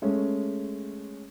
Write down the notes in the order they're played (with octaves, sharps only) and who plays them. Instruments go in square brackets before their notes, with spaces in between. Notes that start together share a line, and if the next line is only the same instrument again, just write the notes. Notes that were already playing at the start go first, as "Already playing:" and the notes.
[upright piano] G#3 A3 C#4